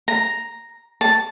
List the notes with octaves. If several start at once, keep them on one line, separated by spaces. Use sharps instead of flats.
A#5
A5